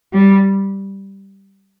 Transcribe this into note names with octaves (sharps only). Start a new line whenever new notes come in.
G3